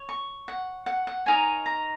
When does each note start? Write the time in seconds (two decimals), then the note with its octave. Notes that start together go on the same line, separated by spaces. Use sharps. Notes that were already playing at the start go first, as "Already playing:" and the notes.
Already playing: C#5
0.09 C#6
0.48 F#5
0.86 F#5
1.07 F#5
1.26 D#4 A#4 C#5 G#5
1.66 A#5